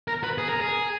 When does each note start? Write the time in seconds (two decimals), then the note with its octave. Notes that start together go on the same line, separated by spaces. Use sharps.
0.08 A#4
0.24 B4
0.38 G#4
0.49 A#4
0.61 G#4